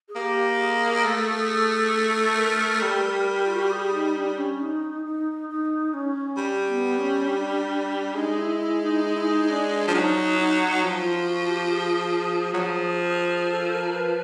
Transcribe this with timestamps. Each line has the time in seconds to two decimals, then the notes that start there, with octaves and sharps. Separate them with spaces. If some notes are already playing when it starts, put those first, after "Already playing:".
0.08 G#4
0.16 A#3 G4
0.60 G#4
1.05 A3
1.94 A4
2.38 A#4
2.83 G3
3.46 F4
3.54 F#4
3.62 G4
3.71 G#4
3.94 D#4
4.16 D4
4.38 C#4
4.60 D#4
5.05 D#4
5.49 D#4
5.94 C#4
6.38 G3
6.67 B3
6.97 C#4
7.27 D4
8.15 G#3 D#4
8.38 E4
8.60 E4
8.83 D#4
9.05 D#4
9.14 E4
9.24 D#4
9.50 D4
9.88 F3
9.94 F#3 D#4
10.34 E4
10.39 D#4
10.83 F3 F4
11.04 F4
11.27 F#4
11.50 G4
11.72 G#4
12.54 F#3
12.60 F3
13.49 A4
13.72 A#4
13.94 B4